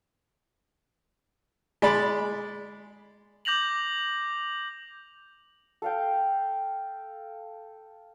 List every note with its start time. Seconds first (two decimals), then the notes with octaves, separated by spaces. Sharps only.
1.82 G#3 D5 B5
3.45 D6 G6 A#6 F7 F#7
5.82 A4 F5 G5